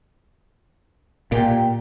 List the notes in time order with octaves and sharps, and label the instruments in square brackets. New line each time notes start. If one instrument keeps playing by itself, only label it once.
[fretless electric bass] A#2 [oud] G4